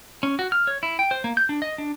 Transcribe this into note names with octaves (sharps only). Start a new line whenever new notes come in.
C#4
F#4
F6
C#5
E4
G5
C5
A#3
G6
D4
D#5
D4